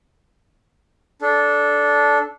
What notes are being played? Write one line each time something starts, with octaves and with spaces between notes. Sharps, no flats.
D4 A4